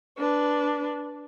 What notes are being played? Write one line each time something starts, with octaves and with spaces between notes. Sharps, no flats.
D4 B4